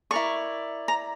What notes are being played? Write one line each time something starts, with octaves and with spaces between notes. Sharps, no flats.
E4 A#4 D5 C#6
A#5